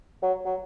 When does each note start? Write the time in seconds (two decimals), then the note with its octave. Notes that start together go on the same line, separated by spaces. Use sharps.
0.23 F#3
0.46 F#3